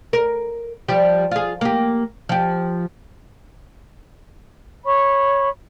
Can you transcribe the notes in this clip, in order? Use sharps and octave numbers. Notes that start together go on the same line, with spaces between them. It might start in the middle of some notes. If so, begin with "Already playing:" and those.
A#4
F3 G3 G4
F4 G#4
A#3 G4
F3 G4
C#5 B5 C#6